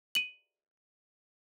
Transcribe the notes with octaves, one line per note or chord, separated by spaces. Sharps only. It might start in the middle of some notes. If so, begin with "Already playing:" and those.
D#7 F#7